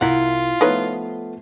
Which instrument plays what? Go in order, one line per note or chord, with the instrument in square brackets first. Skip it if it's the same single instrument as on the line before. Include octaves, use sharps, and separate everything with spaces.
[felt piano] C2 A#5 B6 [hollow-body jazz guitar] E4 F#5 [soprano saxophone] F4
[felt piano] F3 A3 B3 [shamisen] D#4 B4 C#5